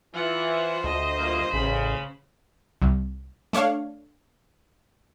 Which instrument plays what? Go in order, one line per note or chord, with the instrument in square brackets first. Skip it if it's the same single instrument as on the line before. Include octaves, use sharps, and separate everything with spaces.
[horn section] E3 [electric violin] F4 F#5
[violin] C5
[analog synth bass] D2 [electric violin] D#5
[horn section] G2 A#3 F4
[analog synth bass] A1 [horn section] C#3 [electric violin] B5
[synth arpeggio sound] C2
A3 D4 C#5 F5